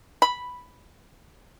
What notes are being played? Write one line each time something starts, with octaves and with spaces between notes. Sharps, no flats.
B5